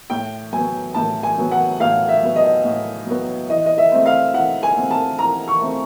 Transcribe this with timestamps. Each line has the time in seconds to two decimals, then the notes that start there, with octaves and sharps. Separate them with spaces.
0.10 A2 G5
0.53 F#3 B3 G#5
0.94 A2 A5
1.23 G#5
1.38 F#3 B3
1.52 F#5
1.80 A2 F5
2.08 E5
2.23 F#3 B3
2.36 D#5
2.65 A2
3.07 F#3 B3
3.49 E3 D#5
3.66 D#5
3.78 E5
3.92 A3 C4
4.06 F5
4.34 E3 F#5
4.63 G#5
4.77 A3 C4
4.91 A5
5.19 E3 A#5
5.48 C#6
5.61 A3 C4